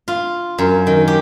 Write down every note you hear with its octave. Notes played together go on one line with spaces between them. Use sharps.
F4
F#2
D#3
G4